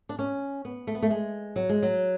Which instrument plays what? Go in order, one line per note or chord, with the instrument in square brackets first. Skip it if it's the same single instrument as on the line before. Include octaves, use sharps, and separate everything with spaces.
[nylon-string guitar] D4
C#4
B3
A3
B3
A3
G#3
F#3
G#3
F#3